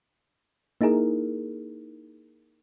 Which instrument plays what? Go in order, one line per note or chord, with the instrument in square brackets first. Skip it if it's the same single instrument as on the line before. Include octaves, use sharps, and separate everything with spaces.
[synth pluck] A#3 D#4 E4 G#4 A#4